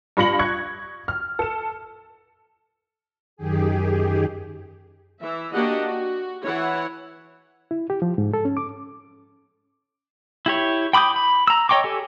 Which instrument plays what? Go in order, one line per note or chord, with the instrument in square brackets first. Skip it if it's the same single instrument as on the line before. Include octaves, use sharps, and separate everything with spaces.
[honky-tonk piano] G2 F4 B5 A#6 C#7 F#7
C#6 F#6 G#6 C#7
F6
A4 E7
[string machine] F#2 D#3 G4 G#4
[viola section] E3 E5
A#3 D4 F#4 G4 D#5 F#5
F#4
E3 E4 C#5 F#5
[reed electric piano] E4
G4
F3
G#2
A4
C#4
D6
[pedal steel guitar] E4 G4 C#5
G5 B5 D6 D#6 G6
B5
A#5 E6
C#5 D#5 G5 C#6 D6
G4 A4 G#5